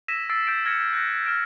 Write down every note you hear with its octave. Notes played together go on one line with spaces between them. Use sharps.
E6 G#6 A#6 B6 D#7 E7
E6 A6 C7 D7
E6 G6 A6 D7
F6 G#6 A#6 B6 C#7 E7
F#6 G6 A#6
F6 G6 D7 E7